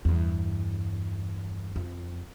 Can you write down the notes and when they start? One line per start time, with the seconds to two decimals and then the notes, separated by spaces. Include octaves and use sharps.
0.05 E2 G2
1.76 F2